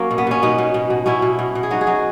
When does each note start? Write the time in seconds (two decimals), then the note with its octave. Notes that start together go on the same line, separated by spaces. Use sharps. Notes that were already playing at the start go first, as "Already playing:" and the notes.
Already playing: F#3 A#3 C#4
0.11 B2
0.18 B3
0.27 B2 C#4
0.42 B2 B3 D#4
0.58 B2
0.74 B2
0.90 B2
1.06 B2 C#4 E4
1.22 B2
1.39 B2
1.55 B2
1.63 G#4
1.71 F#3 D#4 F#4
1.81 G#4
1.87 F#3 D#4 F#4